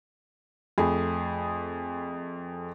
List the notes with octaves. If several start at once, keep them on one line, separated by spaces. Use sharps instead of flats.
F2 A3 G#4 B5